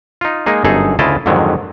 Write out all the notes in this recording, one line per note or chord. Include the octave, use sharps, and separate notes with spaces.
D#4 F4
G#3 A#3 D#4 G#4
G1 F#2 D#4 G#4 A4
D2 C#3 E4 F4 D#5 A5
F2 G#2 D3 D#3 F#3